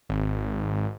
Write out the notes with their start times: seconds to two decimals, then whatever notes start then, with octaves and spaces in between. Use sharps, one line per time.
0.09 G#1